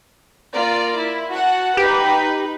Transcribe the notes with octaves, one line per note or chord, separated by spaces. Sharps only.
A#3 F4 D5
E4
F#4 F#5 A5
D#4 G4 B4